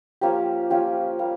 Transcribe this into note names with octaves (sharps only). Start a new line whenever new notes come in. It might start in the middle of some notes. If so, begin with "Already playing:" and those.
F3 A#3 C#4 G4
F3 A#3 C#4 G4
G3 A#3